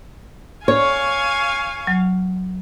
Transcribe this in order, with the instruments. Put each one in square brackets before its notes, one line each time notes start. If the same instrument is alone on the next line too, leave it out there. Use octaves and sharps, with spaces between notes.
[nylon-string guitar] C#5 [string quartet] F5 G#5 C#6
[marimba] F#3